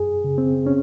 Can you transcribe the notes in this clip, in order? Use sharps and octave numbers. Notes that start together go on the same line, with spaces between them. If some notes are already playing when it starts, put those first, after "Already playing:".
Already playing: F#2 G#4
C#3
C4
C#4